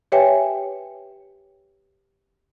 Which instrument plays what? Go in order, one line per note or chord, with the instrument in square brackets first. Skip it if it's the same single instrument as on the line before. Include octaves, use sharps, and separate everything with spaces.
[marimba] G4 B4 C#5 E5 G5 G#5